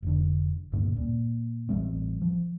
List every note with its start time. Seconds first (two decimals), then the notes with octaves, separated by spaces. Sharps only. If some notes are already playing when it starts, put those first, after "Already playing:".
0.02 F1 D3
0.72 D2 G2 A#2 C#3
0.97 A#2
1.69 A1 G3 C4
2.22 F3